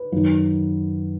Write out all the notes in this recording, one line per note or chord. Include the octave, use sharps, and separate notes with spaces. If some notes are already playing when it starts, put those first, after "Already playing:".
Already playing: B4
F#2 D#3 F#3